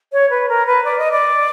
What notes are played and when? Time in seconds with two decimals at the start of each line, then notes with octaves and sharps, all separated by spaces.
0.12 C#5
0.30 B4
0.48 A#4
0.66 B4
0.84 D5
0.98 D#5
1.11 D5